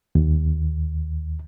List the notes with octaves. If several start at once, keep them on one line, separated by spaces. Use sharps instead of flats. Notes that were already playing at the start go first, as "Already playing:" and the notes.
D#2